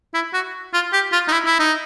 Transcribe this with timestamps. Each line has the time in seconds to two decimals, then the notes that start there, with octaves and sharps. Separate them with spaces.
0.14 E4
0.34 F#4
0.74 F4
0.93 G4
1.12 F4
1.28 D#4
1.32 E4
1.46 E4
1.59 D#4